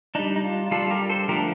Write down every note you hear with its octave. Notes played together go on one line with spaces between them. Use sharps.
G3 D4 D#4
D#4
F4
G3 D4 F4 A4
G4 A#4
A4 C5
D3 F3 A3 D4 G4 A#4